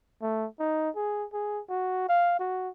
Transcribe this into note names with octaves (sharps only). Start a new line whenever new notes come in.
A3
D#4
G#4
G#4
F#4
F5
F#4